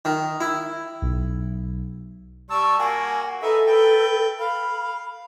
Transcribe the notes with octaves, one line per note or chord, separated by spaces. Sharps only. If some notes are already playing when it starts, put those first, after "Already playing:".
D#3
E4
B1
G3 A5 C#6 E6
A#3 F#4 G#5
D#4 A4 B4 E5
B4 G5
F5 B5